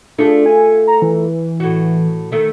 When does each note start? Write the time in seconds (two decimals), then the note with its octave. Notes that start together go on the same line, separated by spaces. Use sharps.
0.18 A3 D4 F4 G#4
0.46 G#5
0.87 A#5
1.02 E3
1.60 A2 F#4
2.32 D#3 A3